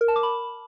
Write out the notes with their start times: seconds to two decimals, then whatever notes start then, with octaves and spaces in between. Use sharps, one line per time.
0.01 A#4
0.08 A5
0.16 D6
0.23 B5